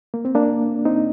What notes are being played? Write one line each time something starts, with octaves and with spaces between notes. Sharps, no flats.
A#3
C4
A#3 D4
C4 D#4